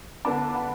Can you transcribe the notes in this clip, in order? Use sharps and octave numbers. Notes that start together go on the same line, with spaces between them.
D3 B3 D4 A5 D6
D6
F#5 B5